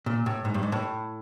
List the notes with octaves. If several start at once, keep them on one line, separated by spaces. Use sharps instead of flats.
A#2
A2
G#2
G2
G#2
A2